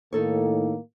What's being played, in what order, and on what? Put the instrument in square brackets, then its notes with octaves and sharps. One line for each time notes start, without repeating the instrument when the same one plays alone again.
[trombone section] A2 D#3 A#3 [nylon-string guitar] D#4 A4 C#5